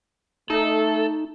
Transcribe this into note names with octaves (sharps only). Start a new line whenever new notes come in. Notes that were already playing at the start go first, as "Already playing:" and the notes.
A3 D#4 A4